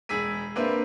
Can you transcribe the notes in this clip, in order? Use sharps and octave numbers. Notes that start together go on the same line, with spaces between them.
E1 G#4 E6 B6 D#7
A#3 C4 D4 B4 C5 E5